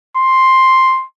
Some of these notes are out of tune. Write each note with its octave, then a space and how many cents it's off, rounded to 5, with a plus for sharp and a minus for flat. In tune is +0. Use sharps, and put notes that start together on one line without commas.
C6 +5